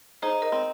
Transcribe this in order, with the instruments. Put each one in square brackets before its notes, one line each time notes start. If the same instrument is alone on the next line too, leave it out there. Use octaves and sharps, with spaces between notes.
[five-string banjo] D#4 [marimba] G#4 C5
[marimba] A#4 D#5
[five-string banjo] C4